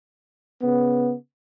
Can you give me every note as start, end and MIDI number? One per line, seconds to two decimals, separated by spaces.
0.62 1.14 49
0.62 1.14 59